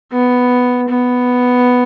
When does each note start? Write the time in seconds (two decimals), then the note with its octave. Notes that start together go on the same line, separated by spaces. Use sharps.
0.12 B3
0.89 B3